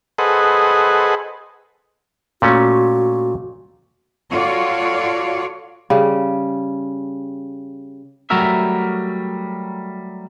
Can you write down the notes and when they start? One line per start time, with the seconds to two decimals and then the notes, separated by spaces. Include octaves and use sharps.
0.18 G#4 A4 B4 C5 D#5 F#5
2.42 A#2 A3 C#4 F#4
4.32 F4 F#4 A4 C#5 D5
5.90 C#3 G3
8.30 F#3 G3 A3 F#4 A#4 E5